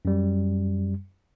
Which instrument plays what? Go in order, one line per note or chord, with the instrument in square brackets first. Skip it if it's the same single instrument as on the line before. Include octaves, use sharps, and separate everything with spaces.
[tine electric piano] F#2 G3